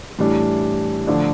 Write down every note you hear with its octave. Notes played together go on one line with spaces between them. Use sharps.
A2 E3 G3 D4
D3 F3 A3 D4